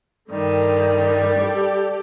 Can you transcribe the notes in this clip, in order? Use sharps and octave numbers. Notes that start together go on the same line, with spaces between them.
G2 D3 D#3 G3
G4 A4 D5